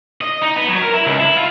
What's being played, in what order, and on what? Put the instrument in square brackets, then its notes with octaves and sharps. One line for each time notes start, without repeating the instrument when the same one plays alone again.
[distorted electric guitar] D#5
D#4
B3
F#3
A#4
E4
C#2
E4
F4